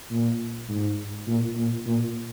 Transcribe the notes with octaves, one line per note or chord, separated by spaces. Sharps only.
A#2
G#2
A#2
A#2
A#2